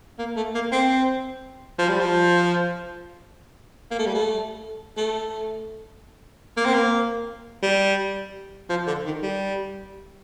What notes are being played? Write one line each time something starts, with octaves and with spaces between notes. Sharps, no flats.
A#3
A3
A#3
C4
F3
G3
F3
A#3
A3
G3
A3
A3
A#3
C4
A#3
G3
F3
D3
D#3
G3